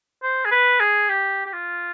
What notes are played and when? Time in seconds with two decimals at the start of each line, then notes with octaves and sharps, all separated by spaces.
0.22 C5
0.45 G#4
0.51 B4
0.80 G#4
1.09 G4
1.46 G4
1.53 F4